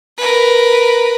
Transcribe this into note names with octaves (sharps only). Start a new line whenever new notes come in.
A#4 B4